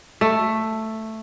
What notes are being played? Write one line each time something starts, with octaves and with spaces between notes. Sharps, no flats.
A3